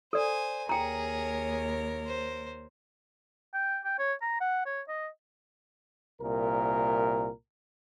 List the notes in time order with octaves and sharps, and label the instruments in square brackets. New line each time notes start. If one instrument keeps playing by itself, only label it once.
[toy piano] A4 D5 [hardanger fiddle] C5 G#5
[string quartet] D#2 A#4 C#5 [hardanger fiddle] G#4 [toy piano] G5 A#5
[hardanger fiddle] C5
[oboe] G5
G5
C#5
A#5
F#5
C#5
D#5
[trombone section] C2 A#2 A#4